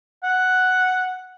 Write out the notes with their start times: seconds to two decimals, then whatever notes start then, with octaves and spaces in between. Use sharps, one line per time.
0.23 F#5